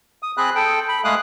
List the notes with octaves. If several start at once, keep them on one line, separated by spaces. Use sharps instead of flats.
D#6
C4 G#4 B5 F#6
A4 G5
B5
G#3 A3 G#4 F5 D#6 F#6